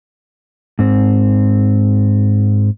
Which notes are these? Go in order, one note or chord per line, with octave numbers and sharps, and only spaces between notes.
G#2 C4